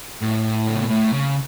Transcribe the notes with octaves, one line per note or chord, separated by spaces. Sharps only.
A2
D3
C#3
B2
A2
C#3